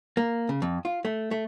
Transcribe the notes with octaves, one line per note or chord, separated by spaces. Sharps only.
A#3
C#3
F2
F4
A3
A3